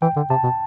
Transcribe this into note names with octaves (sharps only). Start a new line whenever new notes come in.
E3 G5
D3
C3 A5
B2